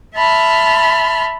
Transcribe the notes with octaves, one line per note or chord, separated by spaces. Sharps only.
E5 A5 B5 C6 F6